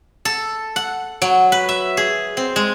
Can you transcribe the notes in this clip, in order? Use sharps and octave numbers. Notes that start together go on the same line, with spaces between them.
A4
F#5
F#3
B4
E5
G#4
C4
G#3